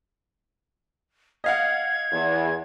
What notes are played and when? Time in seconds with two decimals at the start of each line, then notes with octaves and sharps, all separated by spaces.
1.44 D#5 F5 F#5 G#6
2.12 E2